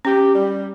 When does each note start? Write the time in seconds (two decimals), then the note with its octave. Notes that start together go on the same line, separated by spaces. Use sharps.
0.05 C#4 G4
0.34 G3